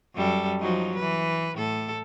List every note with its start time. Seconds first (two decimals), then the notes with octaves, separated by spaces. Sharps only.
0.15 F#2 G3 A4
0.60 F3 F#3 D#4
0.96 E3 B4
1.56 A2 A4